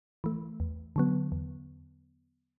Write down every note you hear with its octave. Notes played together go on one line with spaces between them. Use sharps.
E3 A3
E2
D3 F#3 B3
E2